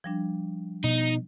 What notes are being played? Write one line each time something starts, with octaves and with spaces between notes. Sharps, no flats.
F3 G3 D4
B2 D#4